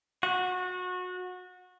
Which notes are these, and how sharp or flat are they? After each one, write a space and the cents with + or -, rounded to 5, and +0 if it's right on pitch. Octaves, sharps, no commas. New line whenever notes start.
F#4 -25